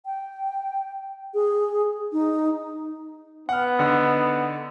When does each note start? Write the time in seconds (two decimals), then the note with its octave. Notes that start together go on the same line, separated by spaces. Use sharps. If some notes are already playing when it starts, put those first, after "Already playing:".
0.06 G5
1.34 G#4
2.13 D#4
3.49 B3 F#5 F6
3.79 D3 D#4 F#5